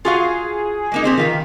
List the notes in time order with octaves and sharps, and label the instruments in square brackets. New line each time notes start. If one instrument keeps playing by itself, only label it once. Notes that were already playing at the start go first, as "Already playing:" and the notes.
[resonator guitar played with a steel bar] F4 F#4 F5 [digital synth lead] G#4
[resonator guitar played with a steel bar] G#3 A#3 D#4
A#3 C4 G4
[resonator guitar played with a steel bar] C3 F4 B4 [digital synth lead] D#3